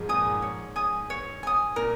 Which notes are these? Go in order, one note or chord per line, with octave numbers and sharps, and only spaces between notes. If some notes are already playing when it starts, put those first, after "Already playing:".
Already playing: G#2 D#3 F3 G#3
A#2 G#5 D#6
G#2
C#5
G#5 D#6
C#5
G#5 D#6
A#2 A#4